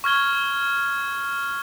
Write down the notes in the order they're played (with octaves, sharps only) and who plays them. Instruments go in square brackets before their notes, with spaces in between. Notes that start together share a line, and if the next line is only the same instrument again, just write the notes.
[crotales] C#6 F6 G#6 G7